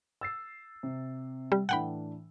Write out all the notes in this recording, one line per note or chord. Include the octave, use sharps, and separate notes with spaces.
E6 A6 C7
C3
G3
A2 E3 D4 F#5 G5 B5